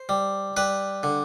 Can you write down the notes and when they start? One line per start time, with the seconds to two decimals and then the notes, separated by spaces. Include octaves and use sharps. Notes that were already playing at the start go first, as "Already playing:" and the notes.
Already playing: C5
0.09 G3
0.57 G3 B4
1.03 D3